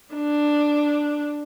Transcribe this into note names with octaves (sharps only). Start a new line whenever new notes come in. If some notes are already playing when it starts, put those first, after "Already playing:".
D4